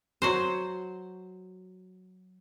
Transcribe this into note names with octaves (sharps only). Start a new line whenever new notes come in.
F#3 F#4 C5